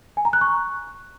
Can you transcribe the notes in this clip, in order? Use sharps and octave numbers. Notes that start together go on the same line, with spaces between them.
G#5
A#5
F#6
C#6